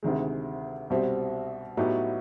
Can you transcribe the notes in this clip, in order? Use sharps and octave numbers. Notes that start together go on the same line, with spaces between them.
D2 C3 D#3 G#3
C2 B2 G3 C4
A2 F#3 B3 D#4 G4